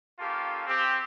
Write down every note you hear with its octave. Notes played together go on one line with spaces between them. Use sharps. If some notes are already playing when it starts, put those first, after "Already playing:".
A#3 C#4 F4 G4 A4 F5
C4 G4